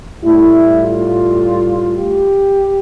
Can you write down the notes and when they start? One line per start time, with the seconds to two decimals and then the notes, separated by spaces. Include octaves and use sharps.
0.23 A2 G3 E4
0.81 F4
1.95 G4